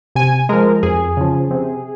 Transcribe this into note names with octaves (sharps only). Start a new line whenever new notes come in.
C3 G#5
F3 G#3 A#4
F2 G#4
C#3 F3
C3